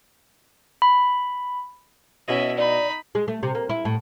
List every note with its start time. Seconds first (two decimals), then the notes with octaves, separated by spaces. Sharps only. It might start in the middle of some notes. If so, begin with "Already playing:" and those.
0.82 B5
2.28 B2 C#4 E4 D#5 E5
2.57 D#4 D5 B5
3.15 G#3
3.28 A3
3.43 C3
3.55 A#3
3.70 E4
3.85 A2